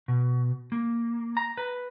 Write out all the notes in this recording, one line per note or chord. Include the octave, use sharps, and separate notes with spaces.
B2
A#3
A#5
B4